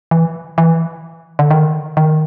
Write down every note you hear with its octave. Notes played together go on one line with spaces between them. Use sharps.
E3
E3
D3
D#3
D#3